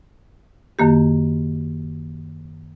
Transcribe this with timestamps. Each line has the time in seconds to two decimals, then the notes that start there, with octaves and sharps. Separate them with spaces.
0.79 F#2 D#3 A#3 G4